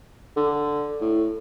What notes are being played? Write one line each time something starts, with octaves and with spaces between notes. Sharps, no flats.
D3
A2